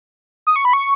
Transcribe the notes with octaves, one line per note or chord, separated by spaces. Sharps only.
D#6
C#6
B5
C#6